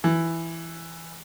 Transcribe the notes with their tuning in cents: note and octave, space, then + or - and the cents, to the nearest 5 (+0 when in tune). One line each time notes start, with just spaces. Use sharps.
E3 +5